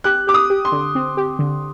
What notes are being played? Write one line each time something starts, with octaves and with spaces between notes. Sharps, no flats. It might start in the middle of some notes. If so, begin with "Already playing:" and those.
G4 F#6
G4 D6
D#6
G4
C6
D3
C4
G4
D3